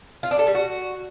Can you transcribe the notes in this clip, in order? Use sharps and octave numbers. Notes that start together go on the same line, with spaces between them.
F4
D4
A4
G3
F#4